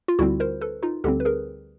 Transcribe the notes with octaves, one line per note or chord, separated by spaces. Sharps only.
F4
D2 D3 G3 C4 E4 F#4
A#4 C5
A4 B4
D#4 F4
D2 D3 G3 C4 G4 A4
B4
G#4 A#4